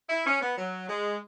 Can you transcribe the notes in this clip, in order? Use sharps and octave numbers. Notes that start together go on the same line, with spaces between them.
E4
C#4
B3
F#3
G#3